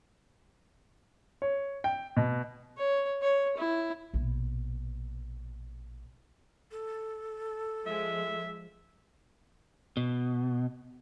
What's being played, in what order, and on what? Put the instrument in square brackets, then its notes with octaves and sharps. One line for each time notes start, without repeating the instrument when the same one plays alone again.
[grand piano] C#5
G5
B2
[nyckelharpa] C#5
C#5
E4
[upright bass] A#1 B2
[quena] A4
[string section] F3 G#3 [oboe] E5
[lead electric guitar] B2